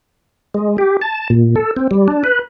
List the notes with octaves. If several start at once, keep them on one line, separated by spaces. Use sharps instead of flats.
G#3
G4
A5
A#2
A4
C4
G3
D4
B4